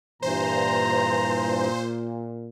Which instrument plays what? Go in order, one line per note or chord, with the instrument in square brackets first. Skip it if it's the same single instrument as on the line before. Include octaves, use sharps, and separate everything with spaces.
[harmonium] G2 E3 [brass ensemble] A#2 [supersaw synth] C5 [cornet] A#5